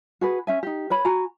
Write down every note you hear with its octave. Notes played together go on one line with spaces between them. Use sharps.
F#4 G#4 B4
C#4 E5 G#5
D#4 G4
B4 C#5 B5
F#4 G#5 A#5